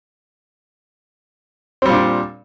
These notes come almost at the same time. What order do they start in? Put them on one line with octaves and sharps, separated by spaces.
C4 G3 A#2 D4